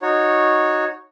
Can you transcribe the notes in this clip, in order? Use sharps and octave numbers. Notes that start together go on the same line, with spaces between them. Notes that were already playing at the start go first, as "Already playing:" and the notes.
D#4 F#4 C#5